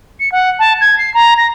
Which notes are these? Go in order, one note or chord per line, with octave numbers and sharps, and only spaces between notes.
C#7
F#5
A5
G#6
C7
A#5
A#6